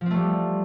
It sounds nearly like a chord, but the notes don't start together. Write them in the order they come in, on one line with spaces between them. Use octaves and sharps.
F3 C4 A3 G3